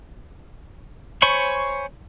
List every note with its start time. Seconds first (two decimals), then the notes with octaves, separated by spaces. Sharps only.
1.22 C5 C#5 G#5 B5 C#6